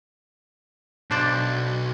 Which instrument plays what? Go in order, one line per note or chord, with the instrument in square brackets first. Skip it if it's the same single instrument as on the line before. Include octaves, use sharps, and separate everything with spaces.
[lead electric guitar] B1 [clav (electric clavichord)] D4 C5 D5